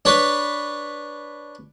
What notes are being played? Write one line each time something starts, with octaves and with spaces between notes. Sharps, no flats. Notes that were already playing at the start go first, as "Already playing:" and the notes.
D4 B4 C#5